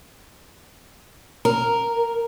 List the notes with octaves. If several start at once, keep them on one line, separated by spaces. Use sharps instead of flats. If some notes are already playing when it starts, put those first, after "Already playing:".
A#4